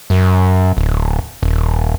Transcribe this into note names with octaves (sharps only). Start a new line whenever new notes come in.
F#2
D1
D#1